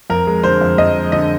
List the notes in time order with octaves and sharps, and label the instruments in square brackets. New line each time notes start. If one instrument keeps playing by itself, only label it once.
[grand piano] F2 A#4
G#3
D3 C5
F2
F2 D#5
G#3
D3 D#5